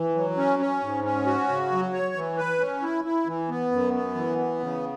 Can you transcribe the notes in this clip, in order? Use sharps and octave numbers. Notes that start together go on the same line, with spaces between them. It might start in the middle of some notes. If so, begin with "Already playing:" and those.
Already playing: E3
F#3
C#4
C#4
G#2
C#4
F#4
C#3
F#3
C#5
E3
B4
C#4
E4
E4
E3
B3
F#2
B3
E3
B3
C#3